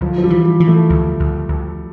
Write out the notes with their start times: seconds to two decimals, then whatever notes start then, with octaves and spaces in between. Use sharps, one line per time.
0.01 D2 F3
0.18 F3
0.24 G3
0.30 E3
0.46 G3
0.60 E3
0.68 A3
0.90 D2
1.20 D2
1.49 D2